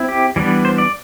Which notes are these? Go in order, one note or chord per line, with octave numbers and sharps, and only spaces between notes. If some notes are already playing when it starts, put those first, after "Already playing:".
Already playing: C4 E4
G4
E3 G3 B3 D4
C5
D5